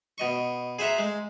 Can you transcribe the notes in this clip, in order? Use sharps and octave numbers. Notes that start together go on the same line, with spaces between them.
B2 D#5 C#6
G#4 C5 E5 F#5 A#5
G#3